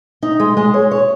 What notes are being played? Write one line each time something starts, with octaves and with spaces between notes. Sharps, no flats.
D#4
G#3
G#3
C#5
C#5